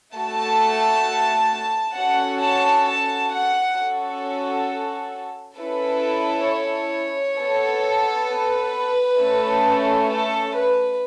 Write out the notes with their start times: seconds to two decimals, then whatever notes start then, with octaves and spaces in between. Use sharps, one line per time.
0.16 A3 F#4 A4 A5
1.96 C#4 F#4 A4 F#5
2.41 A5
2.86 A5
3.33 F#5
3.77 C#4 F#4 A4
5.57 C#4 E4 A4 B4
6.48 C#5
7.38 B3 A4
8.29 B4
9.19 A3 C#4 A4
10.09 A4
10.55 B4